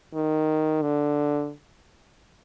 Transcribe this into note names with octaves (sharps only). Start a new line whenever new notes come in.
D#3
D3